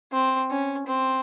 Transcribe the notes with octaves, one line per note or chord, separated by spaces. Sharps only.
C4
C#4
C4